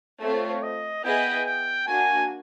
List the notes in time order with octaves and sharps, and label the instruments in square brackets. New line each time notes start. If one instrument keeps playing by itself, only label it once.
[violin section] A3 C4 F4 [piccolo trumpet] C#5
[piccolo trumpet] D#5
[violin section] B3 E4 G#4 B4 D#5 [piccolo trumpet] G5
[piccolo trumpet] G5
[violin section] A#3 D4 F#4 [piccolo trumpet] G#5